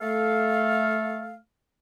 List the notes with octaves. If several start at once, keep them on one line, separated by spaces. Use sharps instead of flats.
A3 A4 F5